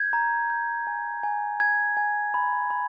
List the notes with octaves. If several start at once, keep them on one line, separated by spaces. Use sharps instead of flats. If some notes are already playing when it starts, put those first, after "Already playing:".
Already playing: G6 G#6
A#5
G6
G#5
G#5
G#5 G#6
G#5
B5
B5